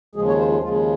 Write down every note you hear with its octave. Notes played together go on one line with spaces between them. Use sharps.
D#2 C#3 F3 G#3 G#4
C#5
C5
F4
D#2 C#3 F3 G#3 F4